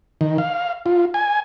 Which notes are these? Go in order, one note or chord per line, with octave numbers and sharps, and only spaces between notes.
D#3
F5
F4
G#5